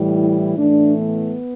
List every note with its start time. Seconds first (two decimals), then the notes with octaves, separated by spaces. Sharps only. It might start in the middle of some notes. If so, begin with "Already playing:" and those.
Already playing: A2 E3 G3
0.17 E4
0.57 A2 E3 A3 D4
0.96 B3